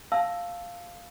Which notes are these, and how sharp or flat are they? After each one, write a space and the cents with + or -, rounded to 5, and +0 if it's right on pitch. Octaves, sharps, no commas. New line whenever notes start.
F5 +0 A5 +0 E6 +0